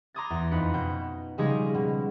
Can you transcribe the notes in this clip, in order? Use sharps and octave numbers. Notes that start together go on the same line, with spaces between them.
A#5 C6 D6 D#6 G#6 A6
E2
F2 D#4 B4 C#7
B2 G6
C#3 F3 G3 G#3 D#4 G#4
B2